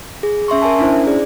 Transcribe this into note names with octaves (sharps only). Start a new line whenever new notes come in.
G#4
C#4 E5 C6 C#6
A#4 E5 G#5 A5
C#4 D4 E4 C5
G#4 D5